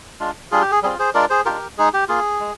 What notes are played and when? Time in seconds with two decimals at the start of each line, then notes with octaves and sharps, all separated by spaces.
0.20 G#3 D4 F4
0.51 G3 D4 F4 G#4
0.61 G4
0.71 G#4
0.83 G3 C4 F4 G#4
0.99 G#4 C5
1.14 G#3 D4 F4 A#4 D5
1.30 G#4 C5
1.45 G#3 D4 F4 G4 A#4
1.78 G#3 D#4 G#4
1.93 G4
2.09 A#3 F4 G#4
2.40 G#3